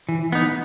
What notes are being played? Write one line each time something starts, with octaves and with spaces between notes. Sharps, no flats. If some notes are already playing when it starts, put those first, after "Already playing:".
E3
B3 D#4